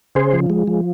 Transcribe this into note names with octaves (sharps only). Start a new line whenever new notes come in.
C#3 G#4 C5
F3
G#3
F3